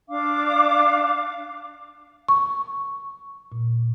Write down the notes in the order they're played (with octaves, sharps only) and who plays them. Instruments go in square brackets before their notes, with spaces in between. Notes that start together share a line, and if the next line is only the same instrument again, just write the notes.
[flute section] D4 F5 D6
[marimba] C#6
A#2